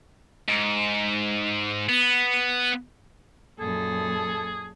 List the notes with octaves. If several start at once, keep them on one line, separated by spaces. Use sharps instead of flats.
G#2
B3
F#2 A#2 G#4 A4